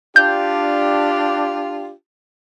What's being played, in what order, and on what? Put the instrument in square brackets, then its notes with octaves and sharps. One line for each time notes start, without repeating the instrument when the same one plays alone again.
[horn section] D4 F4 G4 [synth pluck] G6